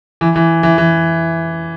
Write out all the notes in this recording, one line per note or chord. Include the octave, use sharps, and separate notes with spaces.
E3
E3
E3
E3